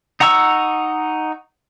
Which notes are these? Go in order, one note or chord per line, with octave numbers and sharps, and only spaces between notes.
D#4 F#5 A#5 C#6 E6